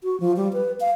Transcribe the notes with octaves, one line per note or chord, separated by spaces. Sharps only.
F#4
F3
G3
B4
F5